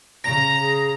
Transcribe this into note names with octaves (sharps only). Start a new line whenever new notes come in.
C#3 A#5 A#6
G#4